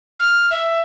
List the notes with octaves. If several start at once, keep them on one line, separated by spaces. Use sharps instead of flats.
F6
E5